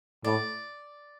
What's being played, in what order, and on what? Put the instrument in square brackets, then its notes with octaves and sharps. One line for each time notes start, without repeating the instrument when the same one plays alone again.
[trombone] A2 [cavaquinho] D5